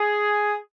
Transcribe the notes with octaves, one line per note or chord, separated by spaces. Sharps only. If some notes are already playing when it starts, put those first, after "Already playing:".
Already playing: G#4